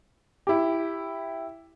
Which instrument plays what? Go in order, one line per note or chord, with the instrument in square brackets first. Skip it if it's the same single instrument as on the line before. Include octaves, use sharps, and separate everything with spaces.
[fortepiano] E4 G4